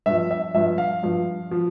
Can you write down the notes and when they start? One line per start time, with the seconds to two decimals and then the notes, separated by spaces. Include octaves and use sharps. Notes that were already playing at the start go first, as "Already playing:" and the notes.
0.06 G2 F3 E5
0.31 E5
0.54 G2 F3 E5
0.78 F5
1.03 G2 F3
1.51 F3